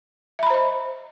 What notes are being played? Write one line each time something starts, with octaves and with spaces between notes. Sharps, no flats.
C5 D#5 E5 A#5 B5